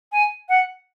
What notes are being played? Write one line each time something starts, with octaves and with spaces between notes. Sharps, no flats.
G#5
F#5